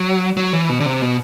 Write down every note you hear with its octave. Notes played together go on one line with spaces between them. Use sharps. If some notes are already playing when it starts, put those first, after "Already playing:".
Already playing: F#3
F#3
E3
B2
D3
C3
B2